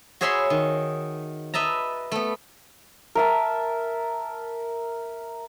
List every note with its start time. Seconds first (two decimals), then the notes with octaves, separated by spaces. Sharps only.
0.21 F#4 G#4 C#5 E5 B5 C6
0.50 D#3
1.54 B4 D#5 E5 A5 A#5
2.12 A3 B3
3.15 A#4 E5 A5